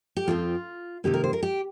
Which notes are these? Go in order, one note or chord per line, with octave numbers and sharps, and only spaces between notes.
G4
F2 F3 C4 F4
C3 D#3 A#3 G4
A#4
C5
A#4
G4